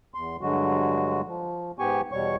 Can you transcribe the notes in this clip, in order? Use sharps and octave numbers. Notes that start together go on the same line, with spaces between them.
E2 C6
G2 D3 F#3 G#3 F#4
F3
G#2 B3 G4 G#5 C#6
E2 B2 G3 C#5 C#6